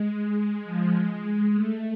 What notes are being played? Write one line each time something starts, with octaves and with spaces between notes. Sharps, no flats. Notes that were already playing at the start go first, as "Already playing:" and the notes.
Already playing: G#3
G#3
F3
G#3
A3